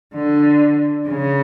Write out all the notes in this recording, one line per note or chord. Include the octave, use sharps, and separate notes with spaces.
D3
C#3